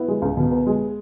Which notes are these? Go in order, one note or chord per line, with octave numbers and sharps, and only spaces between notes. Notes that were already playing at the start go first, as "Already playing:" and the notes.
Already playing: B3 E4
G#3
C#2
B2
B3
G#3